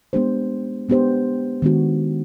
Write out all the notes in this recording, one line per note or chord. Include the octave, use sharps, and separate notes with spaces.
G#3 B3 D4 G4 C5
G#3 B3 D4 G4 C5
D#3 G#3 B3 D4 F#4